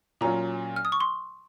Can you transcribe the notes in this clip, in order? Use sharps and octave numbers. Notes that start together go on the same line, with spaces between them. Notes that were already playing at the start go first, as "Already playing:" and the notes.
A#2 F#3 C#4 F4 A#5
F6
D#6
C#6
C6